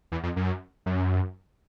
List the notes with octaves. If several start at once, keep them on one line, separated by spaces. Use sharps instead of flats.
E2
F2
F#2
F#2